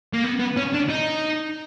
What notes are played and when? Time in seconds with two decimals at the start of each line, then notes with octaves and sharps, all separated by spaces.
0.13 A#3
0.24 B3
0.39 B3
0.56 C#4
0.73 D4
0.89 D#4